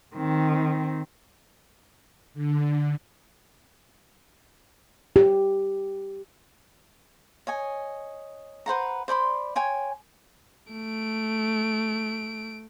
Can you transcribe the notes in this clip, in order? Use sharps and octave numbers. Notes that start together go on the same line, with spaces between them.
D#3 C4
D3
G4
C#5 D#5 G#5
B4 C5 F#5 A#5
C5 D5 B5 C6
C#5 G5 G#5 C6
A3 D7